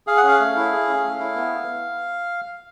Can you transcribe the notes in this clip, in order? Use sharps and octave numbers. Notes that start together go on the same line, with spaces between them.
G#4 F5
F#5
C#4 F5
A3
E4
G#4
C#4
A3
E4
B3